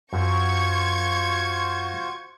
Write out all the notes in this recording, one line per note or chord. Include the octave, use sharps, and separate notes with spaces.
F#2 F4 F#4 C5 C#6 G#6